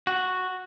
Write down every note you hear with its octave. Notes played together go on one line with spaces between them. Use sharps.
F#4